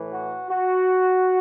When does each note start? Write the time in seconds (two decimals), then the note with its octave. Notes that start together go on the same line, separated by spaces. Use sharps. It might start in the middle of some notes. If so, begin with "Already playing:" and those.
Already playing: A2 E3
0.13 F#4
0.50 F#4